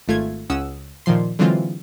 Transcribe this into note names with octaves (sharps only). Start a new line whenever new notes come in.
G#1 A3 F4 G#6
C#2 C#4 F#5 D#6 E6
A#2 D#3 F3 C6
D3 E3 F#3 G#3 C4 F4